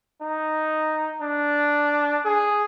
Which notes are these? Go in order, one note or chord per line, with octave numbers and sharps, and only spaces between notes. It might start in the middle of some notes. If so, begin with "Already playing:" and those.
D#4
D4
G#4